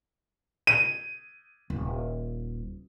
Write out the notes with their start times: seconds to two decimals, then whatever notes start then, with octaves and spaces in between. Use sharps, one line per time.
0.67 D#7
1.70 D#1